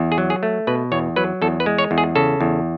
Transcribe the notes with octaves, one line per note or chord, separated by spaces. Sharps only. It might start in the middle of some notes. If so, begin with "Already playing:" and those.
Already playing: E2
G#4
F#3
G#4
A3
B2 B4
E2 C#5
F#3 B4
E2 A4
B4
G#3
C#5
E2
G#4
C#3 A4
E2